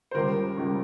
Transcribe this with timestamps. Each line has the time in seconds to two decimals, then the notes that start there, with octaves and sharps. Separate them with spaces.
0.11 C5
0.15 C#2 C#3 G3 A#4
0.58 C#2 C#3 G3